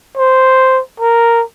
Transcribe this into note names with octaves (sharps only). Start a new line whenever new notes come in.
C5
A#4